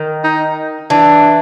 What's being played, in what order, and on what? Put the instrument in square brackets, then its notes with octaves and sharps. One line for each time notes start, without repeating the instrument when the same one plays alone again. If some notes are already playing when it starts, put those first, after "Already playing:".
Already playing: [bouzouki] D#3
[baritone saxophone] D#4
[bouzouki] E3 [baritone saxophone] D4